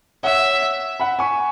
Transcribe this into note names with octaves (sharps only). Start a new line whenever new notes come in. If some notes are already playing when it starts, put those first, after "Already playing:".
C#5 E5 F#5
F#5 B5
G#5 C#6